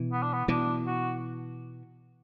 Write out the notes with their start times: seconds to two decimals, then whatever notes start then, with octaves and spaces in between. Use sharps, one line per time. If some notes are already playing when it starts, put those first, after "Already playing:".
Already playing: B2 E3
0.12 B3
0.22 D4
0.33 B3
0.48 B2 E3 D4
0.86 F#4